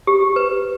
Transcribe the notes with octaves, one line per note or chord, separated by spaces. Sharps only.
G4
B4